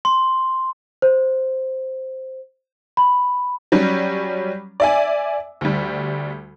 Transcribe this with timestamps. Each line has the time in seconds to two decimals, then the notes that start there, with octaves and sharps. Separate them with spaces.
0.05 C6
1.02 C5
2.97 B5
3.72 F#3 G3 C#4
4.80 D5 E5 G#5
5.61 D2 G3